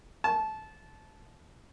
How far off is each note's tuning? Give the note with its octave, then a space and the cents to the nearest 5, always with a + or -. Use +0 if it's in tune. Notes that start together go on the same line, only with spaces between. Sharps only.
A5 -20